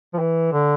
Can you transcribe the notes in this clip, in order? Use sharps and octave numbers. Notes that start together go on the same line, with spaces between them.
F3
E3
D3